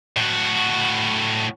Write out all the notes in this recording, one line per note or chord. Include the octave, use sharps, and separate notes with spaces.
A2 F#4